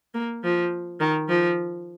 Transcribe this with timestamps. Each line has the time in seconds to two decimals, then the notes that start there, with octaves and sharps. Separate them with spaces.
0.14 A#3
0.43 F3
1.00 D#3
1.29 F3